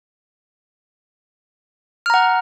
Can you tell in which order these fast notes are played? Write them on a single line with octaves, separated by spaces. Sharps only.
F6 A#5 F#5